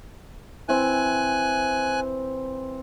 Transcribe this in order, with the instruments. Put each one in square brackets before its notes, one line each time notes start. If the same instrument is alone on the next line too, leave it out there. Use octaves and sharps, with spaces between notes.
[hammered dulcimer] E3 C4 [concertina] G#5 F#6